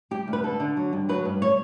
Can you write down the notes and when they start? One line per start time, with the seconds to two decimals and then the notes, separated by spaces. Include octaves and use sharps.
0.11 G3 G4
0.28 D2
0.33 B4
0.43 D3 A4
0.60 D3
0.77 F#3
0.93 G2
1.09 F#3 B4
1.25 G2
1.42 C#5